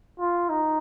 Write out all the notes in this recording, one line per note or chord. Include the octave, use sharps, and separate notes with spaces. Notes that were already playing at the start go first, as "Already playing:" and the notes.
F4
D#4